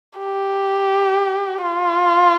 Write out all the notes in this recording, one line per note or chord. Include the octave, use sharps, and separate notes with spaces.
G4
F4